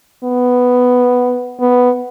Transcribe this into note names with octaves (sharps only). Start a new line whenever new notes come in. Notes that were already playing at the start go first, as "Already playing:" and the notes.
B3
B3